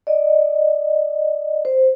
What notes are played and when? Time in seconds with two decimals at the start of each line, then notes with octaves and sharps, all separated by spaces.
0.07 D5 D#5
1.65 C5